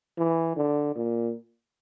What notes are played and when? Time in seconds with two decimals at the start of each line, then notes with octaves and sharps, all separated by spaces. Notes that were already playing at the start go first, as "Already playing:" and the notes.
0.18 E3
0.57 D3
0.96 A#2